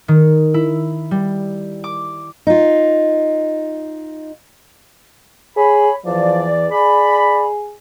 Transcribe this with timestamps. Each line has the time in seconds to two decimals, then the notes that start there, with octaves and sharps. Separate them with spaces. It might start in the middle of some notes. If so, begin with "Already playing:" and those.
0.08 D#3
0.54 E4
1.11 G3
1.84 D6
2.47 D#4 F4
5.57 G#4 C#5 B5
6.05 E2 E3 F3 D5
6.72 G#4 D5 B5